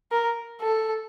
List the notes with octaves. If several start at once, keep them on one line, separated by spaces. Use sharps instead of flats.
A#4
A4